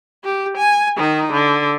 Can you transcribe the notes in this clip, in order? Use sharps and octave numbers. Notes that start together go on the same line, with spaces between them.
G4
G#5
D#3 D#4
D3